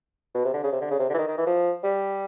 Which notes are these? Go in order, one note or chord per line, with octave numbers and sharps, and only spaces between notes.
B2
C3
D3
C#3
C3
D3
C#3
C3
D3
E3
D#3
D#3
E3
F3
G3